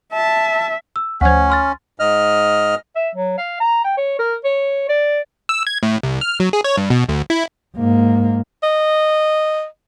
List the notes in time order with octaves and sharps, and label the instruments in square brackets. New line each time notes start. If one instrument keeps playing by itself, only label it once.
[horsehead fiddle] E5 [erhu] A5
[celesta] E6
[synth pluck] D2 F3 [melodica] C#4 [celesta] F#5 G#6
[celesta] C6 F6 A6
[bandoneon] G#2 D#5 F6
[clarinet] E5
F#3
F5
A#5
G5
C#5
A#4
C#5
D5
[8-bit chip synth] E6
G#6
A2
C2
F6
F#3
G#4
C#5
G2
B2
D2
E4
[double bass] G#2 A#3
[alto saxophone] D#5